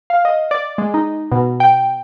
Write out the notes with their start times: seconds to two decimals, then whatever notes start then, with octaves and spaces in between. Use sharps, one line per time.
0.10 F5
0.25 D#5
0.51 D5
0.78 G#3
0.94 D#4
1.32 B2
1.60 G5